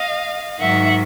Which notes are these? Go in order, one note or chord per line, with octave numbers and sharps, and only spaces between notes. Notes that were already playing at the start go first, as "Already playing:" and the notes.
Already playing: D#5 F5
G#2 D#3 F#3 E5 F#5